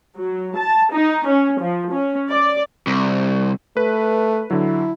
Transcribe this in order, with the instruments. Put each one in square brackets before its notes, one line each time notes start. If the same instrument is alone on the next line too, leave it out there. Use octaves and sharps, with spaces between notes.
[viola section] F#3
A5
D#4
C#4
F3
C#4
D5
[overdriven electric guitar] C2
[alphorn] A3 [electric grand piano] B4
[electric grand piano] D3 F#3 [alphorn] E4